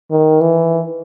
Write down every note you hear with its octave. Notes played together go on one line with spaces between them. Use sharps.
D#3
E3